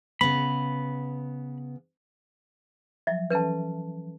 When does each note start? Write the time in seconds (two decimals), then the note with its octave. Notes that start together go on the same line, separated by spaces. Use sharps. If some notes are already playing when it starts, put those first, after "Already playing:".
0.21 C#3 B3 B5
3.07 F3 F#3 E5
3.31 E3 C#4 A4 B4 A5